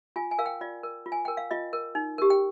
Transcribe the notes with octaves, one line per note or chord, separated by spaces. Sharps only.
F4 G#5
G#5
A#4 F5
G5
F4 D5
A#4
F4
G#5
A#4 G5
F5
F4 D#5
A#4
D#4
G4 A#4
G5